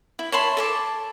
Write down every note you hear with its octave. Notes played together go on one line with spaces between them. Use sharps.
E4
C#5 A5 B5 C6
A4 A5 D6